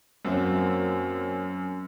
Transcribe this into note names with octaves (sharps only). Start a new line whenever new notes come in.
F#2 A#3 C4 F#4